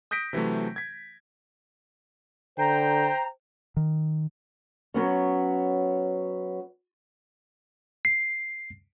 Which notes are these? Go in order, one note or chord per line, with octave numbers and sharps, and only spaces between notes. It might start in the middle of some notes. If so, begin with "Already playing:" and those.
D#6 G6 A#6 B6 D7
C3 E3 F#3 A3
G#6 B6
D3 C5 G5 A#5
D#3
F#3 B3 C#4
C7